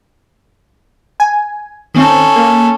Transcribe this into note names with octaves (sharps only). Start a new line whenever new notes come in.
G#5
D#3 C4 C#4 A4
A#3